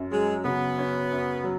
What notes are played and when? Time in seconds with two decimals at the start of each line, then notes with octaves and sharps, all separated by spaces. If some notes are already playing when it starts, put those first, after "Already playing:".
Already playing: F#2 C#4
0.11 F#3 G#3
0.45 C#3 B3
0.78 C#4
1.11 F#2
1.43 F#3